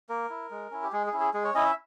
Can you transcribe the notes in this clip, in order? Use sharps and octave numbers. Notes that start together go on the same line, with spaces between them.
A#3 A#4
E4
G#3
C#4 E4
G4
G#3 G#4
G#4
C#4 E4
G#4
G#3 G#4
C#5
C#4 E4 D#5
E5